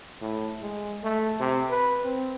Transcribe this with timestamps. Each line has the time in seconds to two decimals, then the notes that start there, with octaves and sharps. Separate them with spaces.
0.21 A2
0.62 G#3
1.04 A3
1.40 C3
1.70 B4
2.04 C4